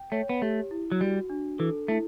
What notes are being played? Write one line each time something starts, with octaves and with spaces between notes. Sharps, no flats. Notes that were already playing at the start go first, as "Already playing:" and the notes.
Already playing: G5
A3 C#5
B3
A3 G4
E4
F#3
G3 F#4
D4
E3 A4
A3 E4